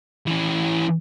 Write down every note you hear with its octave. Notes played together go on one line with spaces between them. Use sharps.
E3 C#4